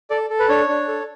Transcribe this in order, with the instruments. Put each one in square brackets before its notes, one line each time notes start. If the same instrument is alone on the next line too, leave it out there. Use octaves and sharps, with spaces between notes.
[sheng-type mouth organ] A4 D5
A4
B4
D4 C#5
D4
A4